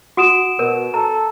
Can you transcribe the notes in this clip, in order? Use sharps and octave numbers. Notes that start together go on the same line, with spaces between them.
F#4 F#5 D#6 D7 E7
B2 A#4
A4 A#5